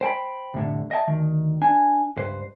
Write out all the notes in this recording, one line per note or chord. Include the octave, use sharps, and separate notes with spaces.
C5 G5 A5 B5
C2 F2 A2 D3
D#5 E5 G5 A5
D2 D#3
D4 G#5
C#2 G2 B4 C5